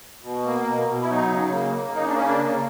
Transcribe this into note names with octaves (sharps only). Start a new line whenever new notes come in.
B2
A#3
B2
B2
E4
F#3 D#4
C#3
A#3
A#3
C#3 D#4
D4
A#3 C#4
D4
C#3